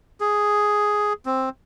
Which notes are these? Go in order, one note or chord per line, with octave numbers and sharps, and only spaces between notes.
G#4
C4